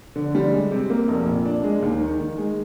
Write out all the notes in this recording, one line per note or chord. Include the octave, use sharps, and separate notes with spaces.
D3
G3
G#3
C3
A#3
F1
A#2
D4
G#3
D#2
D#3
D#3
G#3